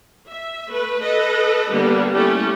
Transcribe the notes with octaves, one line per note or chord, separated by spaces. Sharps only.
E5
A3 B4
A4 B4 D#5
D3 G3 A#3 B3
G3 A3 C#4 E4 G4